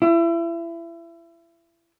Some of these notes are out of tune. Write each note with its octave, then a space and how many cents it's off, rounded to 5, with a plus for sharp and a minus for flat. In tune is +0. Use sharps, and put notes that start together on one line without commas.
E4 +30